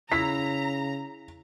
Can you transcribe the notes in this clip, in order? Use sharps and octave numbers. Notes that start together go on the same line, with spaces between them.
C#3 E4 A#5 B6